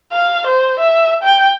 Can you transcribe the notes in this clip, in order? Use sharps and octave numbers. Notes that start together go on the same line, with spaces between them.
F5
C5
E5
G5